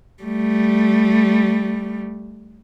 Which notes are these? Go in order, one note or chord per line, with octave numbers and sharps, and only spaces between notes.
G3 A3